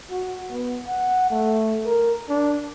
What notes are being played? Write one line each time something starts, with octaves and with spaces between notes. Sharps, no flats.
F#4
B3
F#5
A3
A#4
D4